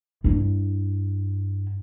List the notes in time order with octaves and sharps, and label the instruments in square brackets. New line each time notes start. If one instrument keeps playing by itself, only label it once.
[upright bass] G2 E4